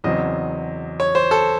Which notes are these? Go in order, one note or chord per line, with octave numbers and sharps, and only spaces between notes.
E2 C#3 F#3 C4 D#5
C#5
C5
A4